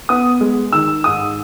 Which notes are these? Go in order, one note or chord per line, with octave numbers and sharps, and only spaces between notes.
B3 D#6
G#3
D#3 E6
G#2 D#6